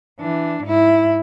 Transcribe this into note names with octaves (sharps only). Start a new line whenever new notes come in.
E3 D4
G#2 E4